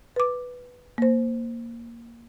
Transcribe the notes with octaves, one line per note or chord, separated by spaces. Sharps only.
B4 D6
A#3 C5